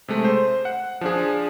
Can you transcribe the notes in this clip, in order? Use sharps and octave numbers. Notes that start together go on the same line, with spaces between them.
C3 G#3 A3
C5
F#5
F3 D4 G#4